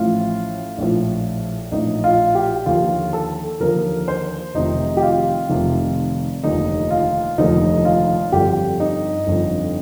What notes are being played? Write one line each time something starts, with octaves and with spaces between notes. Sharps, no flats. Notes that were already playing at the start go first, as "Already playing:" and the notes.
Already playing: A1 A2 F3 F4
A#1 A2 F3
A#1 A2 F3 D#4
F4
G4
D#2 D3 F3 F4
A4
D#2 D3 F3 A#4
C5
F1 F2 C3 D#3 D#4
G4
F4
F1 F2 C3 D#3
F1 D#2 D3 F3 D#4
F4
F1 D#2 D3 F3 D#4
F4
G1 F2 D3 G4
D#4
G1 F2 D3